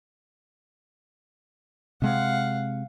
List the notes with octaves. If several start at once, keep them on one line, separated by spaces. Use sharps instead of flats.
C3 G#3 F5 F#5